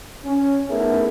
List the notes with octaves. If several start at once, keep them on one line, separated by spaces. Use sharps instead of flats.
C#4
A3 B3 D#4 E4 G#4 A#4